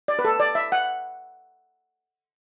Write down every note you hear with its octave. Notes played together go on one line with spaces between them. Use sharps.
D5
B4
A4
D5
E5
F#5